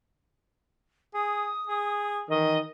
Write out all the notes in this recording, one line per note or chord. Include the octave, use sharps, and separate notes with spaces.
G#4 D#6
G#4
D#3 E3 D#5